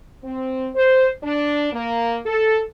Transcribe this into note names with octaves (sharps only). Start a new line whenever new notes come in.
C4
C5
D4
A#3
A4